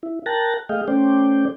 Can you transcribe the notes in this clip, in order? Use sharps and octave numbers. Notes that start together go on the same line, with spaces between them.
E4
A#4 G5 A5 F#6 A6 A#6
A3 G#4 D#5 F5 G5
A3 C#4 C5 D5 G5